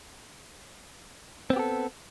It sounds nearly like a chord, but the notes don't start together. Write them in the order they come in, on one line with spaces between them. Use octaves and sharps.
C4 B3 G4 A4